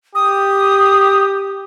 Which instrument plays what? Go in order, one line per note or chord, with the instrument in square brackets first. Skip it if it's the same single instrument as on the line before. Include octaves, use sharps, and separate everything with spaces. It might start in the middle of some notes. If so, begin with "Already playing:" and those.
[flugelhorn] G4 [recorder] D#6